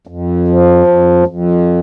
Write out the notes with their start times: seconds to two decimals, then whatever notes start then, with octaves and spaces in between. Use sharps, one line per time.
0.07 F2
0.48 F3
0.87 F2
1.27 F2